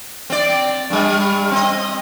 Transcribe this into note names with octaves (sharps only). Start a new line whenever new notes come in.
C4 D5
G2 G3
C4 D#5